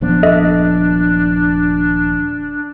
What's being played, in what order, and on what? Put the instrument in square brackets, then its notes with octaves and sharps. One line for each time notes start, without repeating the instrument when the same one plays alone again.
[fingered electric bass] D#1 F3 B3 [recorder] D4
[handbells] A4 D#5 E5